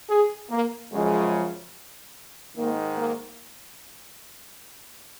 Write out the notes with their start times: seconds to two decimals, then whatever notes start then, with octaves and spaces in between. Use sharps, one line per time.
0.10 G#4
0.50 A#3
0.92 F#2 C#3 F3 G#3
2.55 G#2 D#3 A#3
2.96 A#3